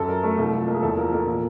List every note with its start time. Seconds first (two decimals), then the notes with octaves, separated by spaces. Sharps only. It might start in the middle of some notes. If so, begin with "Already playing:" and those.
Already playing: F#2 A4
0.08 F#3 A#4
0.23 A3 A4
0.38 C2 A4
0.53 F3
0.68 A#3
0.74 G#4
0.82 E2 A4
0.97 F3 A#4
1.12 A#3 A4
1.27 A#2